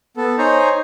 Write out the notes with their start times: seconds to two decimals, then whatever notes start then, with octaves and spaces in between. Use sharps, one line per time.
0.17 B3 A4
0.38 D#4 C5 C#5 G#5 A#5